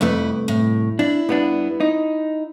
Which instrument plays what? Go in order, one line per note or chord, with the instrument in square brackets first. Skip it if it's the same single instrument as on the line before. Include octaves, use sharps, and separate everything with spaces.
[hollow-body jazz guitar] C2 A3 [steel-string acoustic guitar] F2 E4 B4
[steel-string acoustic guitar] A2
[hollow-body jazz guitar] D4 [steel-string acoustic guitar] E4
[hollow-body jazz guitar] G2 B3 D4
D#4